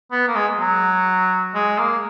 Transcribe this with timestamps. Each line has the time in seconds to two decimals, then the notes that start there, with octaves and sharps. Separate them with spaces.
0.12 B3
0.28 A#3
0.36 G#3
0.59 F#3
1.54 G#3
1.78 A#3